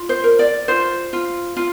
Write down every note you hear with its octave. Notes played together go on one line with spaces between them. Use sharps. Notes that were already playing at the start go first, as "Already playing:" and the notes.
Already playing: F4
C5
A#4
D5
F4 C5
F4
F4